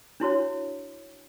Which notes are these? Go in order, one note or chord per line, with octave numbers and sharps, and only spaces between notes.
D4 E4 F#4 C#5